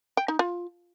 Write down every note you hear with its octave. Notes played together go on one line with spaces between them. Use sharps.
G5
D#4
F4